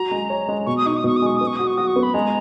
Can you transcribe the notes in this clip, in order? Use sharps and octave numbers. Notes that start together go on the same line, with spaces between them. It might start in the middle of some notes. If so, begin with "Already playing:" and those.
Already playing: F#4 A#5
G#3
C#5
G#3
B2 C#6
D#6
D#4 C#6
D#6
B2 C#6
D#6
G#3 C#6
B3 D#6
C#6
F#4 D#6
C#6
F#4 D#6
C#6
B3
B5
G#3 A#5